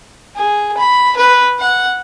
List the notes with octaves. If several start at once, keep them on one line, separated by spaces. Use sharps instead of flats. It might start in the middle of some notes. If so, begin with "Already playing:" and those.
G#4
B5
B4
F#5